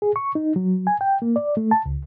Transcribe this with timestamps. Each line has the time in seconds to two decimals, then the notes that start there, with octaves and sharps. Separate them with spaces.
0.02 G#4
0.16 C#6
0.35 D#4
0.56 F#3
0.87 G#5
1.01 G5
1.22 A#3
1.36 D5
1.57 A3
1.71 A5
1.86 C#2